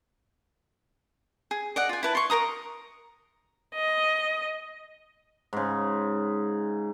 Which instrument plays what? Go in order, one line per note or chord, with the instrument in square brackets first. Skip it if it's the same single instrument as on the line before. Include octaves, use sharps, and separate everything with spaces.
[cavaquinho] G#4
D5 D#5 F#5
F4 G#5
E4 B4 A5
C6 C#6
A#4 C5 A#5 D#6
[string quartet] D#5
[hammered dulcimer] G#2 C#3